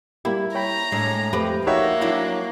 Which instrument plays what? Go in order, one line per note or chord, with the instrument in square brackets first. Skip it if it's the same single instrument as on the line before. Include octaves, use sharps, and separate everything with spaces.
[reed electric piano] G3 A#3 G4 [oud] E4
[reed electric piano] C#5 G5 B5 [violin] A#5
[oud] A2 G#3 D4
[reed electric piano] F2 A3 [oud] F3 G4 B4
[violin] A#3 [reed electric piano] D#4 F#5 G5 [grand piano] F#4 C#5 E5
[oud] F#3 D4 D5 [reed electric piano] E4